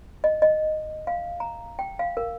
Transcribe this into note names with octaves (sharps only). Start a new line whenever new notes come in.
D#5
D#5
F5
A#5
G5
F5
A#4